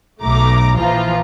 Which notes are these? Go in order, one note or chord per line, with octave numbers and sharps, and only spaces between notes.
B1 B2 A3 A#5 D6
A#1 E3 F3 F4 A#5